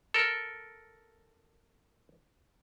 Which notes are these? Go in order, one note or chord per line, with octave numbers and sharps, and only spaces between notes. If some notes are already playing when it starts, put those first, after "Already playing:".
A4 A#4